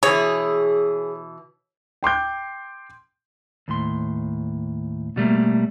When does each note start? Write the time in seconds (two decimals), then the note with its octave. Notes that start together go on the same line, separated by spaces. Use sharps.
0.03 B2 E3 G#4 C#5
2.03 G5 C6 D6 G6
3.68 D#2 A2 C6
5.16 B2 G3 A3 A#3